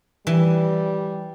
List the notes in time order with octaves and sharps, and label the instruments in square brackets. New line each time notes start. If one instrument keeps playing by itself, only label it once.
[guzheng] E3 [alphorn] G3